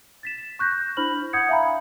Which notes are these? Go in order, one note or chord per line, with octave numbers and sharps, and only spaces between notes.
A6 B6 E7
C#6 F#6 G6 A#6
D4 E4 C5 B5 F6 F#7
F#5 D#6 G6 G#6 C#7
E5 F5 G#5 A#5 B5